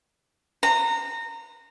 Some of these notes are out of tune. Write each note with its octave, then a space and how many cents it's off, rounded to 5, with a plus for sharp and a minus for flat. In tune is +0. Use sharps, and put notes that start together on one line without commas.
A#5 -20